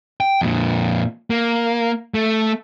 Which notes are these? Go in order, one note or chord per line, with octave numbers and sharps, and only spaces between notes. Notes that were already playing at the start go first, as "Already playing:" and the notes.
G5
F2 A#2
A#3
A3